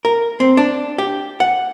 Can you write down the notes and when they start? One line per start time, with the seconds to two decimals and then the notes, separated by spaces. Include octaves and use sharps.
0.05 A#4
0.40 C4
0.57 D4
0.98 G4
1.40 F#5